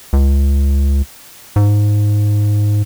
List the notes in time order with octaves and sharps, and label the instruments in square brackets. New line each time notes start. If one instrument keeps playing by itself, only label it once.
[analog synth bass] C#2
G#2